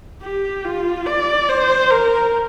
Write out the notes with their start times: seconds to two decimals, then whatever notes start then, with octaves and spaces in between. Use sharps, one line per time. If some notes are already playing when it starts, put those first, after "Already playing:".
0.22 G4
0.64 F4
1.06 D5
1.49 C5
1.91 A#4